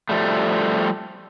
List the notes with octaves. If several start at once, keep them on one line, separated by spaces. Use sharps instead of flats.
F3 G3 A3